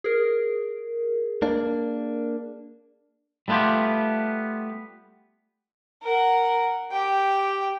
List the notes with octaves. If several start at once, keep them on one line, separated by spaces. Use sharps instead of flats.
G#4 A#4
A#3 D4
G3 A3 B3 F4 G4
A#4 F#5
G4 G5